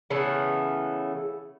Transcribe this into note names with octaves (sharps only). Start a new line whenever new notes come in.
C#3 E3 A3 B3